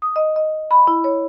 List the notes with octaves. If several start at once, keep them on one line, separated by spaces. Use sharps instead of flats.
D#6
D#5
D#5
B5
E4
C#5